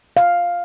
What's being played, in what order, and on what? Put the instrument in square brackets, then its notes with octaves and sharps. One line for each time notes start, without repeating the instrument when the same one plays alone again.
[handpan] F5